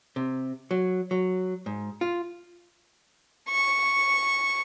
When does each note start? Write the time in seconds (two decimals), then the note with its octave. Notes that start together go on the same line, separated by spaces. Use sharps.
0.16 C3
0.71 F#3
1.11 F#3
1.66 G#2
2.01 F4
3.50 C#6